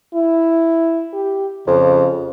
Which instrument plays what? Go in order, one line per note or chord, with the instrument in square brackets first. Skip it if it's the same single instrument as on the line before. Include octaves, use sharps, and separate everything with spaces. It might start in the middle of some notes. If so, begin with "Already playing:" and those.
[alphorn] E4
G4
[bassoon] F2 [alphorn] C#3